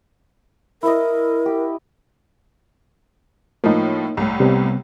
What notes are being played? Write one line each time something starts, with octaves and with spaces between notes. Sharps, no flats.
E4 A#4 D#5
G4
A2 F3 A#3 D#4
C2 A2
C3 G3 B3